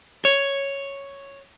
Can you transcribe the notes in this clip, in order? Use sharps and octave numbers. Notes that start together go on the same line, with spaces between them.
C#5